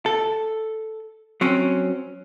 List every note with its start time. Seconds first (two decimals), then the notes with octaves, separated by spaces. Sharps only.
0.06 A4
1.41 F#3 C4 C#4